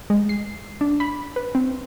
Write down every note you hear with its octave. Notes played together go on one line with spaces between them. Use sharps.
G#3
C7
D4
B5
B4
C4